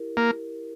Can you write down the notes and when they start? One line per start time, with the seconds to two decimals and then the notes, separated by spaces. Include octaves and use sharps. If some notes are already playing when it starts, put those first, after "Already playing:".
Already playing: E4 G4 A#4
0.17 A#3